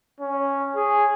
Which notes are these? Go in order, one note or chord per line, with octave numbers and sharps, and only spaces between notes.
C#4
G#4